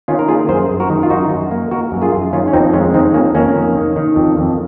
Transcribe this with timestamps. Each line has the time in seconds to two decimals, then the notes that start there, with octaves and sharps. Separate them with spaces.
0.08 D#3 C#4 F4
0.19 A#4
0.28 A#3 F4 G#4
0.49 F#2 G#4 C5
0.70 F#2
0.80 F#4 A#4
0.90 D#3
1.03 F4
1.10 F#2 D#4 F#4
1.30 F#2
1.51 A#3
1.71 A#3 F#4 A#4
1.92 F#2
2.02 F4 G#4
2.13 F#2
2.33 D#3 C#4 F4
2.48 C#4
2.53 F2 C4 D#4
2.73 G#3 C#4 F4
2.94 D#3 C4 D#4
3.14 F2 A#3 C#4
3.35 F2 A#3 C#4
3.56 D#3
3.76 D#3
3.96 D#3
4.16 F2
4.37 F2